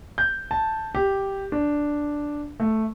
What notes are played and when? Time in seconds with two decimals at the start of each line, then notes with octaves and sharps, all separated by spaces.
0.18 G6
0.51 A5
0.95 G4
1.52 D4
2.60 A3